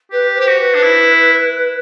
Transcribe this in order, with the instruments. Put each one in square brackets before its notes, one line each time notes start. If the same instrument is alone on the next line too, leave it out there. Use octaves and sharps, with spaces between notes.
[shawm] G4 [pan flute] B4
[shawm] G4 [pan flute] C5
[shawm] F#4
[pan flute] B4
[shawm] D4
E4